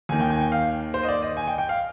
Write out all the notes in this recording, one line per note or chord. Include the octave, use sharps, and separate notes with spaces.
D#2 D#3 G#5
G5
G#5
G5
F5
C5
D#5
D5
D#5
G#5
G5
G5
F5